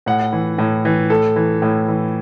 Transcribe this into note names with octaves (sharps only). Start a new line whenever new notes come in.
A2 F#5
E3
A2
E3
A2 A4
E3
A2
E3